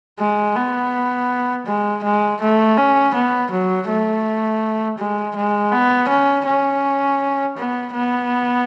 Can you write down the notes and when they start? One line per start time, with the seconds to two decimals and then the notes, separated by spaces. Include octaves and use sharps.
0.20 G#3
0.55 B3
1.66 G#3
2.04 G#3
2.41 A3
2.77 C#4
3.14 B3
3.51 F#3
3.88 A3
4.98 G#3
5.36 G#3
5.72 B3
6.09 C#4
6.46 C#4
7.57 B3
7.94 B3